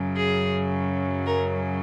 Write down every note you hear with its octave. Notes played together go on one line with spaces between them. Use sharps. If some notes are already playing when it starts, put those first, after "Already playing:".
Already playing: F#2 C#3 F#3
G#4
A#4